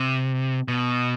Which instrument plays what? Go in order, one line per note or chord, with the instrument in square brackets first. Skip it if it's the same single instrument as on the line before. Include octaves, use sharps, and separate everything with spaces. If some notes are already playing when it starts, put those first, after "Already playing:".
Already playing: [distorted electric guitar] C3
B2